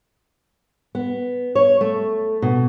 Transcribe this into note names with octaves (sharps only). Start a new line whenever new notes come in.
B3
C#5
A3
B2